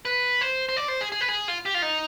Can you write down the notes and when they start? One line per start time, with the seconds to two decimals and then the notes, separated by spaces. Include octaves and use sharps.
0.05 B4
0.41 C5
0.69 C5
0.76 D5
0.88 C5
1.01 G#4
1.12 G#4
1.21 B4
1.28 G#4
1.48 F4
1.66 G4
1.74 F4
1.82 D#4